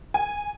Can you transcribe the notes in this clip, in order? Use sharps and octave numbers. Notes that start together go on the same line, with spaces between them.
G#5